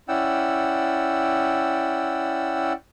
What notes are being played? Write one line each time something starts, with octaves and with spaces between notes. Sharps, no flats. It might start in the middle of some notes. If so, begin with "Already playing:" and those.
C#4 E4 D5 F#5 G5 E6